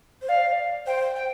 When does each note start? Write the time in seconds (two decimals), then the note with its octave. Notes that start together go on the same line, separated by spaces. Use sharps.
0.22 C5
0.28 D5 F5
0.86 C5 G5
1.15 G5